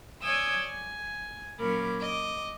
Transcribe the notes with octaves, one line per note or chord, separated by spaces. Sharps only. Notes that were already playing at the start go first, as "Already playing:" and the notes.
C#5 D5 G#5 D#6 E6 G6
G#5
A#2 F#3 C#4 A#4 B5 D6
D#5 D6